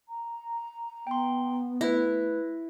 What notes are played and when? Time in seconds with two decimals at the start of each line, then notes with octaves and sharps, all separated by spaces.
0.08 A#5
1.07 B3 G5 C6
1.81 A3 E4 B4 A#6